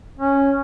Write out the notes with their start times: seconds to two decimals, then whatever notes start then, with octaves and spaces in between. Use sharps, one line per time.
0.18 C#4